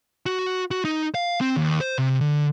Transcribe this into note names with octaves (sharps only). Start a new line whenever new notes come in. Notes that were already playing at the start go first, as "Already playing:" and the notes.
F#4
F#4
D#4
F5
C4
D#2
C5
C3
D3